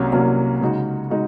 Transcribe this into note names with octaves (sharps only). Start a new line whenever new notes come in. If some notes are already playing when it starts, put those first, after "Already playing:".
Already playing: C2 C3 F#3 A#3 C#4
C2 C3 F#3 A#3 C#4
C#3 G#3 D#4 F#4
G#3 D#4 F#4